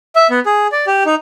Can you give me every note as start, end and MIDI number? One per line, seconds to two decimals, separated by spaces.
0.16 0.27 76
0.30 0.40 59
0.46 0.67 68
0.72 0.86 74
0.87 1.04 67
1.06 1.15 63